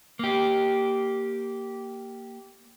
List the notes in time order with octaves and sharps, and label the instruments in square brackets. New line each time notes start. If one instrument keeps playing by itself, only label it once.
[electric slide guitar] A#3 G4